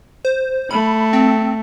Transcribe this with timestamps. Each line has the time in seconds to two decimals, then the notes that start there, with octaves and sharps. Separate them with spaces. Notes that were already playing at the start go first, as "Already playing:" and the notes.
0.25 C5
0.71 A3 B5
1.13 C4